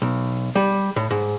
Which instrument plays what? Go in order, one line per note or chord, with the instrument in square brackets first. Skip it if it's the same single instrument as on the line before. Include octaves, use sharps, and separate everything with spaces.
[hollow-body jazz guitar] B1
G3
A2
G#2